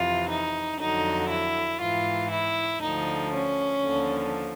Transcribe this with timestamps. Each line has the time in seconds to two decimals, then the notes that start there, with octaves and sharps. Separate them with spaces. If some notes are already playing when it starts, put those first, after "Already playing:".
Already playing: F2 C3 E3 F4
0.29 D#4
0.79 F2 D3 F#3 D#4
1.30 E4
1.80 G#2 E3 F4
2.30 E4
2.81 D2 D3 F3 D#4
3.32 C#4
3.84 D#2 D3 F3